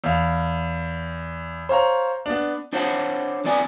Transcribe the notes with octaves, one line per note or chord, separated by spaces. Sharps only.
E2 F5
C5 C#5 F5 A#5
B3 D4
D4 C5 C#5 F#5 G#5 A5
F2 D3 B3 D5 G#5